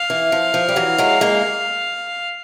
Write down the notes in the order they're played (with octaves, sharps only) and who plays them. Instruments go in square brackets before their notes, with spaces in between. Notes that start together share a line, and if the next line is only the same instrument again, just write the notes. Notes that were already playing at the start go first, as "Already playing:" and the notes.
Already playing: [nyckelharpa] F5
[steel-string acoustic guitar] E3
F3
F3
G3
E3 F#3
F#3 G#3
G#3 A#3